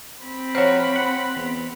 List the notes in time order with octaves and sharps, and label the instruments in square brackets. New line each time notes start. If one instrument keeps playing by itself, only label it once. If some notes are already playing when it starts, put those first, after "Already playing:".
[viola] C4 B5
[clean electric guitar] F3 F#4 A#4 [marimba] C5 C#5
[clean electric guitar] F#5
E2